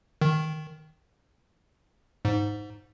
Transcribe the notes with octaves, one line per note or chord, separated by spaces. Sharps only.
D#3
G#2